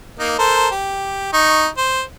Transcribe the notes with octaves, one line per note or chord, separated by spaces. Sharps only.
A#3 D#4
A4 A#4 C5
G4
D#4 C#6
C5